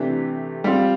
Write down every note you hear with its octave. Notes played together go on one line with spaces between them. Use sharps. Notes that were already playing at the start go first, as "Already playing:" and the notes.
Already playing: C3 E3 A3 D4 G4
G3 C4 F4